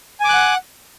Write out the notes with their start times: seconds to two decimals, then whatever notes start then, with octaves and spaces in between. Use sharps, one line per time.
0.20 G#5
0.25 D6
0.29 F#6
0.34 F#5